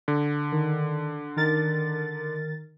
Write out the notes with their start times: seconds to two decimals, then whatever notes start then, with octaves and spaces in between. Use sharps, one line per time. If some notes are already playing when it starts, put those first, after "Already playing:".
0.08 D3
0.52 D#3
1.36 D#3 A#4 A6